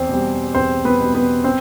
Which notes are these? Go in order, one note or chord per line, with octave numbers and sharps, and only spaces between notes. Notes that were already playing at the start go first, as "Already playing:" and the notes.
Already playing: E2 C4 C5
B2 G3
E2 C4 C5
B3 B4
B2 G3
B3 B4
C4 C5